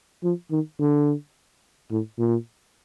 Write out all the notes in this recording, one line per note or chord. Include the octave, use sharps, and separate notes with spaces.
F3
D#3
D3
A2
A#2